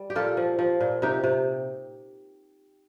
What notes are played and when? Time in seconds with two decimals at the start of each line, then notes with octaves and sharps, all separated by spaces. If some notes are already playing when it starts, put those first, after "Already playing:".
Already playing: G3
0.10 G4
0.15 A#2 F4 A4
0.37 F3
0.59 F3
0.81 A#2
1.02 C3 D#4 G4
1.24 C3